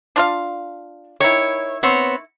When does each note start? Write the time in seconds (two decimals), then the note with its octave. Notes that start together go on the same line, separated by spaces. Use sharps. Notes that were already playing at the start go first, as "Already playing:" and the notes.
0.16 D4 F4 F5
1.20 D#3 E4 C#5
1.83 B3 C4 C#5